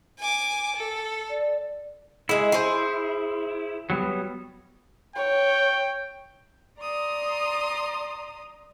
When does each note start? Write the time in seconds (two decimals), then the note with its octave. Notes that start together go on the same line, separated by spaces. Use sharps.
0.19 G#5 D6
0.76 A4
1.30 D5
2.29 G#3 E4 G#4
2.52 G#4 C5
3.90 F#3 G3 B3
5.16 C#5 G5
6.79 D5 A#5 C6 D#6